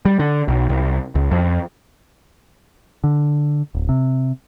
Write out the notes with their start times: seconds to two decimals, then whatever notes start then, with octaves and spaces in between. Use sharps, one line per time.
0.05 G3
0.19 D3
0.48 B1
0.69 C2
1.15 C#2
1.31 F2
3.04 D3
3.75 D1
3.89 C3